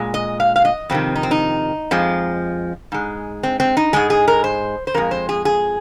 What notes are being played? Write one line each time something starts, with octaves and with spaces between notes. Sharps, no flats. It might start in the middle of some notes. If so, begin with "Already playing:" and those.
Already playing: A#2 G#3
D#5
F5
F5
D#5
F2 C3 D#3 C4
D#4
C4
D#4
F2 F3 G#3
G#2 G#3
C4
C4
D#4
G#2 G#3 G#4
G#4
A#4
C5
C5
F2 F3 G#3 A#4
C5
G#4
G#4